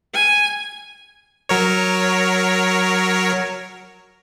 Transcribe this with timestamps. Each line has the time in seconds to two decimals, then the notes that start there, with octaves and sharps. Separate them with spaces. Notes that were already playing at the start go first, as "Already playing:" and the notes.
0.14 G#5
1.49 F#3 A#4 C#5